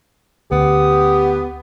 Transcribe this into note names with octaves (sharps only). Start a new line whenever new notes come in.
D2 B3 G4 D#6